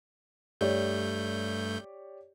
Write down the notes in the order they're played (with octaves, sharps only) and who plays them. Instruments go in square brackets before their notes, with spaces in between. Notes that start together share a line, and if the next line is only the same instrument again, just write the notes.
[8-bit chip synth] G2 A3 G6 [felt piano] G4 C#5 D5